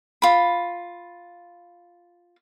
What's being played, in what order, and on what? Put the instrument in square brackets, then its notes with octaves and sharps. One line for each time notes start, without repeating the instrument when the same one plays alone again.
[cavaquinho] F4 B5